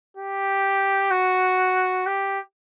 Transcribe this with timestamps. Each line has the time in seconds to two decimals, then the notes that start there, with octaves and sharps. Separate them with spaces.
0.17 G4
1.11 F#4
2.06 G4